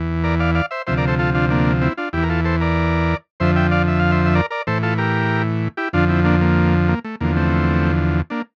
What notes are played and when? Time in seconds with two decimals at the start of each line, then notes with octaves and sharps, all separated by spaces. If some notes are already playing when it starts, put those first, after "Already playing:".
Already playing: E2 E3
0.24 A#4 D5
0.40 D5 F5
0.55 D5 F5
0.71 C5 E5
0.87 D2 C3 F3 C5 E5
0.97 A#4 D5
1.08 A4 C5
1.19 F4 A4
1.34 D4 F4
1.50 A#3 D4
1.81 C4 E4
1.97 D4 F4
2.13 E2 E3 E4 G4
2.23 A#4
2.29 F4 A4
2.45 A4 C5
2.60 A#4 D5
3.40 F2 D3 F3 C5 E5
3.56 E5 G5
3.71 D5 F5
3.88 E5
3.99 F5
4.11 C5 E5
4.26 E5
4.35 A#4 D5
4.50 A#4 D5
4.67 A2 E3 A4 C5
4.83 F4 A4
4.98 G4 A#4
5.77 E4 G4
5.93 F2 D3 F3 D4 F4
6.09 C4 E4
6.24 A#3 D4
6.41 A#3
6.88 A#3
7.04 A3
7.21 E2 D3 F3 A#3
7.36 A3 C4
8.30 A#3 D4